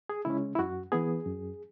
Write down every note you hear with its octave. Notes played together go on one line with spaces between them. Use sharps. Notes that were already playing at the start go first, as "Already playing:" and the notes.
G#4
C#3 G#3 C#4 E4
E4
F#2 F#4
E3 B3 G#4
F#2